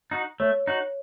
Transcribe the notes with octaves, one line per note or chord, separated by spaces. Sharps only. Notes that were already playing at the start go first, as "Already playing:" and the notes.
D#4 F#4
A3 C#5
D#4 F#4